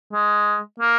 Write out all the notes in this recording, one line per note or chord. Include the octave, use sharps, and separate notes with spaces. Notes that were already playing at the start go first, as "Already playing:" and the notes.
G#3
A#3